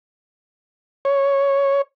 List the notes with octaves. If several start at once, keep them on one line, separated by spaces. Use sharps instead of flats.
C#5